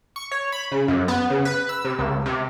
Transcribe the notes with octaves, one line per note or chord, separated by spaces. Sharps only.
C#6
C#5
B5
C#3
F#2
B3
C#3
B4
E6
C3
C#2
C3